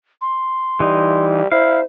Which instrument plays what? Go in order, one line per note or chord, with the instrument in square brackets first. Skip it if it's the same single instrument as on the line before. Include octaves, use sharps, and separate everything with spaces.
[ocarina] C6
[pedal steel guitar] E3 D#4 [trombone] G3
[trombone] E4 [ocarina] C5 [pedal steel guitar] F5